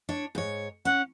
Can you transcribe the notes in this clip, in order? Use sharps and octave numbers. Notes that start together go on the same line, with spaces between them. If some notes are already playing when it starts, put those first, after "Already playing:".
D4 C#5
G#2 C#5
C#4 F#5